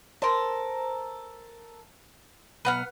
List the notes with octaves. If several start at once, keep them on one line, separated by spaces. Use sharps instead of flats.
A4 A#4 C5
B1 B3 B4 F#5 F6